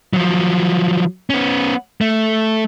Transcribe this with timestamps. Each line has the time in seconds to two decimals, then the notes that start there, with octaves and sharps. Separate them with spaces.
0.13 F3 F#3
1.30 B3 C#4
2.01 A3